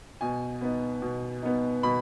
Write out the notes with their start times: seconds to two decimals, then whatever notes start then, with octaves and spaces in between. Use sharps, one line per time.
0.21 B2 G#5
0.61 B3 D#4
1.02 B2
1.42 B3 D#4
1.83 B2 B5